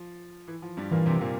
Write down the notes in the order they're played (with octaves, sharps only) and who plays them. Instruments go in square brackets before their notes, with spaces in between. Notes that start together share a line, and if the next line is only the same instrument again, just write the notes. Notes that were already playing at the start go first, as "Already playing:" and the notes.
Already playing: [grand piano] F3
E3
F3
G2 G3
[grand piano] A#2 A#3 [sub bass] E3
[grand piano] C3 C4
C4
A#2 A#3